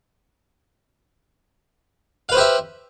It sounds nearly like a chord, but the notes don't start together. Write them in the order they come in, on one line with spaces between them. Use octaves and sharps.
F5 B4 C5 G4 E5